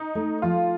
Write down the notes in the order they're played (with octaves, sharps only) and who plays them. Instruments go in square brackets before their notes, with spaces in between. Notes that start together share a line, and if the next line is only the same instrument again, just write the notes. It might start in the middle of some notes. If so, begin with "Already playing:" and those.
Already playing: [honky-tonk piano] D#4
[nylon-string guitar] A3
[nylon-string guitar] F3 [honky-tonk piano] F4